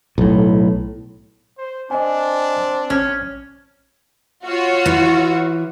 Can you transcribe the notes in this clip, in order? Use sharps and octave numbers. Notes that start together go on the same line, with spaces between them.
B1 A2
C5
C4 D4 D#5 G#5
A1 C#4 F6 G#6
F4 F#4 C#5
E3